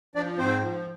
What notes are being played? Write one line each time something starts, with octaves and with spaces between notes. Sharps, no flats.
F3 D4 D5
G#2 C4 C5
F3